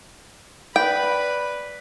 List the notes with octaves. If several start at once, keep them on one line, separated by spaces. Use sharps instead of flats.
B4 D5 G5 B5